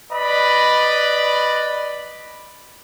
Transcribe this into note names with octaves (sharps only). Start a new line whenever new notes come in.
B4 D5 D#5 B5